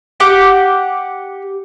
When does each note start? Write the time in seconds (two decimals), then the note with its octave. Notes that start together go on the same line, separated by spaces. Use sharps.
0.20 G4 F#5 D6